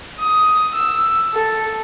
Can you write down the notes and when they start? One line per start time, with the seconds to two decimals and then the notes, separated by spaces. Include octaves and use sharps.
0.19 D#6
0.74 E6
1.34 A4